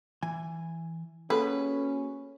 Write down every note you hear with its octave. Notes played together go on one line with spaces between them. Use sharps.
E3 G#5
A#3 C#4 F#4 G#4 A4 B4